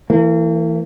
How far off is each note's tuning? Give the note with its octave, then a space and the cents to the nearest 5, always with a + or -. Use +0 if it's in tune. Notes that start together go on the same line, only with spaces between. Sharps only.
E3 +0 A#3 -45